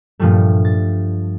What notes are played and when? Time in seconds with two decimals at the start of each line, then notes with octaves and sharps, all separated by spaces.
0.20 G2 A#2 F3 G3 A3
0.65 A6